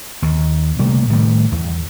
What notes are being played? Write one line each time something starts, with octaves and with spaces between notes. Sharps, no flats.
D#2
C3 G3 A3 A#3
A2 D#3 G3
E2